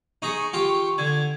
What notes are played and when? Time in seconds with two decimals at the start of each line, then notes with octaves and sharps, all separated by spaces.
0.22 D#4 G#4 C#6
0.53 F4 G4
0.98 D3 G#6